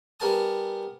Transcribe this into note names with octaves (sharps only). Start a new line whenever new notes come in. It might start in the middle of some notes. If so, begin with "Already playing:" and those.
G3 B3 A#4 G#5 A5 D#6